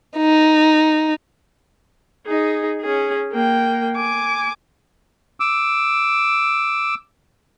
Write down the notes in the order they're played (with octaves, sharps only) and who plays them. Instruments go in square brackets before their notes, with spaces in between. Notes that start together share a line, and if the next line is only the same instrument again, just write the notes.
[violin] D#4
[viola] D#4 G#4
C#4 G#4
A#3 G5
G#5 D6
[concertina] D6 E6